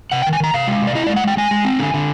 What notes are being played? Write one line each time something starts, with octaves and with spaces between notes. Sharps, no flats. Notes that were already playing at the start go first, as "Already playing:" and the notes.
C3 F#5
D#3 G5
G#5
D#3 A#5
C3 F5
G#3
C3
D5
E4 D#5
G#3 D5
F#5
G#3 G5
G#3 G#5
G#3
C4
D3
D3